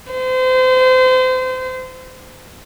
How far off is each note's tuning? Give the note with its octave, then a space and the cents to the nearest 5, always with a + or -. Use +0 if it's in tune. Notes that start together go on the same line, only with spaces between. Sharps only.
C5 -30